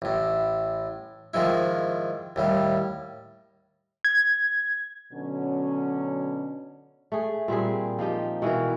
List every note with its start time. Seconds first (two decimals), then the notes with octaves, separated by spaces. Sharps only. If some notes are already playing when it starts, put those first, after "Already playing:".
0.02 A1 A2
1.34 G#2 D#3 F3 G#3 E4
2.36 D#2 A2 G3
4.05 G#6
5.13 B2 D3 F#3 C#4
7.12 A3 G#4
7.48 A#2 G3 C4 G#4
7.98 F3 A#3 D#4 G4
8.42 B2 E3 A#3 A#4